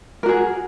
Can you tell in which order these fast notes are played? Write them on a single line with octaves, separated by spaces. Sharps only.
A#4 F#4 G#4